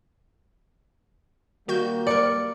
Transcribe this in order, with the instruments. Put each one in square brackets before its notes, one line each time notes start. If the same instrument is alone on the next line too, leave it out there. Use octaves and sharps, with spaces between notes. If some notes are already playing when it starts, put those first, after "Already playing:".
[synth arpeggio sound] D#3 F#4 G6 [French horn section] G3 A#3
[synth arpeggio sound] A#4 F#6 C#7 [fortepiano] D5